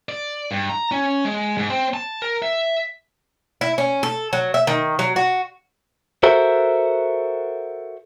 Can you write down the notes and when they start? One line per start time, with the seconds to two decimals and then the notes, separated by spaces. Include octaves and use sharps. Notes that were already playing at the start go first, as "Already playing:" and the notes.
0.09 D5
0.51 G2
0.70 A#5
0.92 C#4
1.25 G#3
1.58 G#2
1.70 C4
1.94 A5
2.22 A#4
2.42 E5
3.61 E4
3.78 C#4
4.03 A4
4.33 F#3
4.54 E5
4.67 D#3
4.99 F#3
5.16 F#4
6.23 F#4 A4 A#4 C5 E5